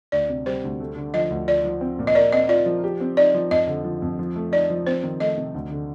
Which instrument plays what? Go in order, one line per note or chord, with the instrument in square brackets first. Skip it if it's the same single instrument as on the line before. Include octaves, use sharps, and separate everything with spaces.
[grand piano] D2 [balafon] D5
[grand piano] C3
[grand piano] G3 [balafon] C5
[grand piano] D2
A3
D3
[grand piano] F3 [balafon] D#5
[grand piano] D2
[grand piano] F4 [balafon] D5
[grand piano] F3
C4
A#2
[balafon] D#5
[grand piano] A#4 [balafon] D5
[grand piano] C4 [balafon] D#5
[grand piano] F4 [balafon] D5
[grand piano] F3
G4
C4
[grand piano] D#4 [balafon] D5
[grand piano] F3
[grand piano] F2 [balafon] D#5
[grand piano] D3
F3
F2
F3
A3
[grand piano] D#4 [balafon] D5
[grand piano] F3
[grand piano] C4 [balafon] C5
[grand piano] D#3
[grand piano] A3 [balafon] D#5
[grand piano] C3
D2
D3